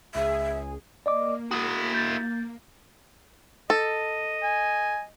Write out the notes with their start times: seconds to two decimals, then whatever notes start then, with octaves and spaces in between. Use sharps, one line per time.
0.15 C#2 G#4 E5
1.06 A#3 D5 D#5 D6
1.51 E4 F#4 D#6
1.94 G6 A6
3.70 A4 D#5
4.43 G#5